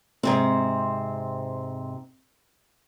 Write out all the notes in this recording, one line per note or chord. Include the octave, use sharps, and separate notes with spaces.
G#2 C3 C4